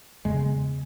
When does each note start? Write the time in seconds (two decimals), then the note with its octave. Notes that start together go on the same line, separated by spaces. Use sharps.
0.25 E2 C#3 G#3